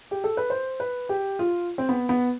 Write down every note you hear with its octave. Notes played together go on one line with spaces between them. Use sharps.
G4
A4
B4
C5
B4
G4
F4
C4
B3
B3